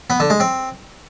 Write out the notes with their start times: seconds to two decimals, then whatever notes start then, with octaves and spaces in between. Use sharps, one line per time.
0.10 B3
0.20 D3
0.30 G#3
0.40 C4